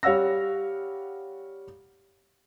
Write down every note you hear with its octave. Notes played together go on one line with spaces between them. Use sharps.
G3 C#5 F5 F#5 E6 A#6